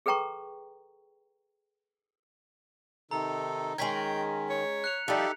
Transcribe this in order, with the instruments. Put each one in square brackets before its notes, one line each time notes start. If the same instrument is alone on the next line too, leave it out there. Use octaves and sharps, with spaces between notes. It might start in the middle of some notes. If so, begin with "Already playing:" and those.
[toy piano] G#4 A4 B4 G5 A#5 C#6
[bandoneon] C3 D#3 A4 [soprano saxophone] D#4 [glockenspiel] A#5
[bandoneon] D#3 [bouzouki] G#3 C#4 A#4 [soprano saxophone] G5 [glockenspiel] G#6 B6
[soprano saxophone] C#5
[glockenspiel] F#6 C#7 F7
[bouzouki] F3 G3 [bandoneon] D#4 G4 A4 [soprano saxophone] E5